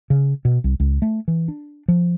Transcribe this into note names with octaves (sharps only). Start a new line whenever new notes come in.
C#3
B2
C2
C#2
A3
E3
D4
F3